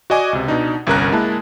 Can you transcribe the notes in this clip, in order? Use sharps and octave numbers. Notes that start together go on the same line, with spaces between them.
F#4 D5 D#5 G#5 D6
C#2 C3
B2 D4 D#4
G1 C2 C#4 A#4 A#5 F#6
G#3 A#3 E4 A5